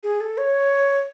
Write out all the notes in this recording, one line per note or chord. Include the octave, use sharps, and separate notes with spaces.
G#4
A4
C#5